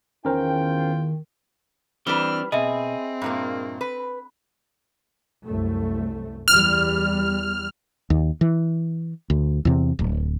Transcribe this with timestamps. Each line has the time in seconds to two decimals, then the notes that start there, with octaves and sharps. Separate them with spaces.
0.25 E2 D#3 C#4 F4 A#4 C5 G5
2.07 E3 G3 C4 D4 B4 F6
2.52 B2 C4 G#4 D#5 E5
3.22 G2 A#2 A#3
3.81 B4
5.44 C2 F#2 A3
6.48 E2 G3 F6
8.10 D#2
8.41 E3
9.30 D2
9.65 E2 C3
9.99 D1